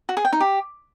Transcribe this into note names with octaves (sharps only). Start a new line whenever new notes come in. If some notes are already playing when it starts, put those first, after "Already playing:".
F#4
G#4
G5
D#4
G4